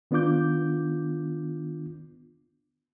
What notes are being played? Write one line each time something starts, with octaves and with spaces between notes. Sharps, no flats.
D#3 B3 D4 F4 D6 G6